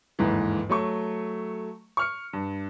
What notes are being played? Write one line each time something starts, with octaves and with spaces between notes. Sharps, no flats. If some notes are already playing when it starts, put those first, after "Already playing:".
G1 D#2 G#2 E3
F#3 A3 C#6
C#6 F6 C#7
G2